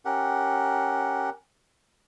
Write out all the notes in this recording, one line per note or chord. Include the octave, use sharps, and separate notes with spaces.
C#4 G4 A#4 F#5